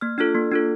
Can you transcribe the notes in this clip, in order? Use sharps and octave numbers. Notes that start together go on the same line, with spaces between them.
A#3 F6
D4 F4 A4 F6
A#3
D4 F4 A4